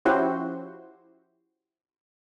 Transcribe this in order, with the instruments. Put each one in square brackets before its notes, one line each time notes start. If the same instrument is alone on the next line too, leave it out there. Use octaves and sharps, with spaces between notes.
[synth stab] F3 C#4 E4 F#4 G4 C5